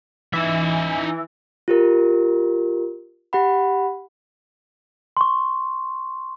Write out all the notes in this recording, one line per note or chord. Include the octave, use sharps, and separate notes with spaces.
E3 D#4 E5
F4 G4 A#4
G4 F#5 B5
C6 C#6